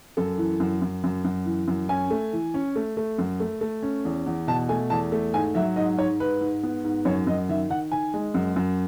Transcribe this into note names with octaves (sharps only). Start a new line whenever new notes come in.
F#2 A4
E3
F#2
F#2
F#2
F#2
E3
F#2
C#4 G#5
A3
E3
C#4
A3
A3
F#2
A3
A3
C#4
E2
E2
B2 A5
A3 G#5
E2 A5
A3
G#2 G#5
F#3 E5
G#2 D#5
G#2 C#5
G#2 B4
G#2
B3
G#2
F#2 C#5
F#2 D#5
D#3 E5
D#3 F#5
D#3 G#5
G#3
F#2
F#2